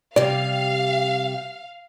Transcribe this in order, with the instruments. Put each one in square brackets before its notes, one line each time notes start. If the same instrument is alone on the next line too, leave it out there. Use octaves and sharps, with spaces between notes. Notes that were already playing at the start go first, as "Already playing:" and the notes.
[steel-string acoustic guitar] C3 G3 [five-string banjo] D5 [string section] F5